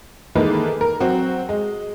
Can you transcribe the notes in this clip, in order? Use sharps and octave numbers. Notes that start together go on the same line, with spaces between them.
D#3 E3 G#3 A#3 A4 B4
A#4
F#3 C4 F#4
G#3